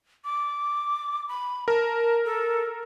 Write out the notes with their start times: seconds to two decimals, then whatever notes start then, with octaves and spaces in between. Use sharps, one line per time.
0.24 D6
1.29 B5
1.68 A#4 A5
2.25 A4